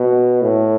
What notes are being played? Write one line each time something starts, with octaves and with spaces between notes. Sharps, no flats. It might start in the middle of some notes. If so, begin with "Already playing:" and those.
Already playing: B2
A2